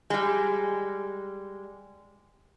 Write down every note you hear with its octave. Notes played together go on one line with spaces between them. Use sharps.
G3 G#3